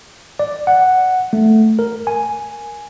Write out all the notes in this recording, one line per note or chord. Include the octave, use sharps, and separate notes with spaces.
D5
F#5
A3
A#4
G#5